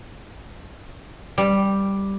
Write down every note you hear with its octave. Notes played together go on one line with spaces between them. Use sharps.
G3